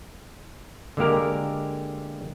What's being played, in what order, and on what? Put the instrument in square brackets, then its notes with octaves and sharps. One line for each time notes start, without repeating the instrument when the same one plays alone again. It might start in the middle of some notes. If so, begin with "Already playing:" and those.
[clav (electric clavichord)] D3 G#3 A#3 G4 A#4